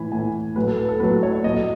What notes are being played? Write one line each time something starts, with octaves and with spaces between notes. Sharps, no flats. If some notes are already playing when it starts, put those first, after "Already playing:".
Already playing: A2 E3 G#5 B5
A2 E3 G#5
A2 F#3 B4
A4
B4
A4
A2 F#3 B4
C#5
A2 F#3 D#5